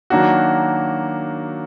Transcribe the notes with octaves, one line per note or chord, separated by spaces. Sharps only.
D#3 F#3 A#3 D4 F#4